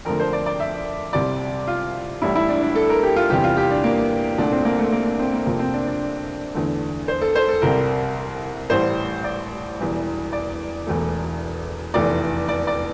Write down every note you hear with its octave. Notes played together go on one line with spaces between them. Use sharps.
F2 D3 F3 A3 A#4
C5
D5
D5
E5
C2 C3 G3 D5
F4
A1 A2 G3 E4
E4
D4
D4
A4
A#4
G4
F4
E2 C3 E3 G3 G4
F4
G4
D4
A#3
C2 A#2 A3 D4
C4
A#3
A3
A#3
D4
C4
A#3
F2 C3 F3 A3 A#3
C4
D4
D4
E2 D3 A3
C5
A4
C5
A4
C2 C3 G3 A#4
A1 A2 G3 C5
D5
E1 E2 E3 G3
D5
E1 E2 E3 A3
F1 E2 E3 A3 D5
D5
D5